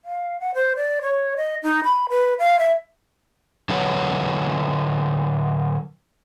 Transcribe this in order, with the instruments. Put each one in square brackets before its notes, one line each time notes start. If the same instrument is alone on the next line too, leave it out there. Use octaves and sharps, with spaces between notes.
[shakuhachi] F5
F#5
C5
D5
C#5
D#5
D#4
B5
B4
F5
E5
[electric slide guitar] D3 F#3 F#4 B4 C#5